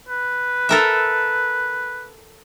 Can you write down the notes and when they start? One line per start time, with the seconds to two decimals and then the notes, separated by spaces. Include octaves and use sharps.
0.09 B4
0.69 A4 A#4 E5